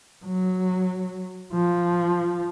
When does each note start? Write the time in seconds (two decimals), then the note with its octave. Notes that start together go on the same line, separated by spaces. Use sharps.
0.25 F#3
1.53 F3